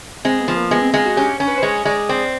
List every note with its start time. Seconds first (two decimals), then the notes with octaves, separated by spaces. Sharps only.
0.25 G#3 C4
0.41 B3
0.48 F3
0.56 A#3
0.71 G#3 B3
0.82 C4
0.94 G#3 F4
1.06 F#4
1.16 C#4 G4
1.40 C#4
1.47 B4
1.58 C5
1.63 G#3 C#5
1.74 C#5
1.85 G#3 D5
2.09 C4 D5